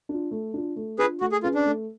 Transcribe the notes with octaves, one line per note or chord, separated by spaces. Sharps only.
D4 F4
A3
D4 F4
A3
D4 F4 G#4 B4
A3 F#4
G#4
C#4 F4 G#4 B4
D4
A3